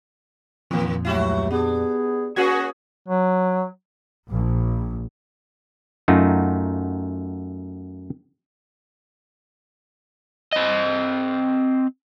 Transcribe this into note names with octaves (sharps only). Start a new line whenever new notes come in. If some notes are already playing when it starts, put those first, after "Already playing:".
F2 A#2 D#3 A#3
C#2 F#3 A3 E4 F#4 G4
B3 D4 G#4
A#3 C#4 F#4 G#4 G#6
F#3
A#1
F#2 A3 D#4 F4 F#4
C4 D#5